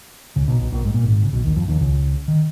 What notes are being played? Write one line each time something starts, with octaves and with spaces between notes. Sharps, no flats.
C#2 C#3
B1 B2
B1 B2
A#1 A#2
G#2
A#2
G#1 G#2
C#3
B1 B2
D#2 D#3
F2 F3
D#2 D#3
C#2 C#3
D#3